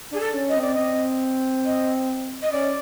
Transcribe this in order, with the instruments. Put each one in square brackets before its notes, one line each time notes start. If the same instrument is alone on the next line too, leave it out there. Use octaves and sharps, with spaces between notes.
[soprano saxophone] D4 [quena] G#4
[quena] A4
[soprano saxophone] C#4
[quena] D#5
[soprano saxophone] C4
[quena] D5
[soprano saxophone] C4 [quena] D#5
[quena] D#5
D#5
[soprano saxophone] C#4 [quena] D5